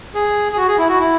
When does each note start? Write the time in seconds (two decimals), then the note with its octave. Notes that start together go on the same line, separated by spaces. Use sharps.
0.15 G#4
0.52 G#4
0.57 F#4
0.68 G#4
0.78 E4
0.89 F#4
1.00 E4